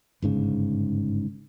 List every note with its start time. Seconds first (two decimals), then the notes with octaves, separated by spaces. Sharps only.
0.22 G1 G#2 C#3